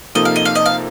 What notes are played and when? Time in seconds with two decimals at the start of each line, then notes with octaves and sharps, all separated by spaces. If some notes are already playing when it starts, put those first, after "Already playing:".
0.15 C3 F3 A#3 D#4 A4 D#5
0.25 F5
0.36 D#5
0.45 F5
0.55 D#5
0.66 F5